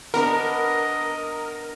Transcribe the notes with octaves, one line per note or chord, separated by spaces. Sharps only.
B3 D4 A#4 D#5